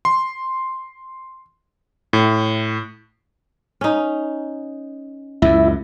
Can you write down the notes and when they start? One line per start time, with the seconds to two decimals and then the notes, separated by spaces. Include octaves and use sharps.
0.05 C6
2.13 A2
3.81 C#4 D#4
5.42 C#2 F#2 E4